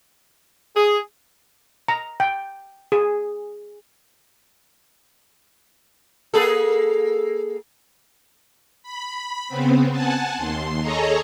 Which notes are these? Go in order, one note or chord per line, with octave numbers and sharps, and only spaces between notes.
G#4
A#5
G5
G#4
A#3 G#4 A4
B5
C#3 B3 C4
F#5 G#5 A5
D#2 C6
G#4 A4 C#5 D#5 A#5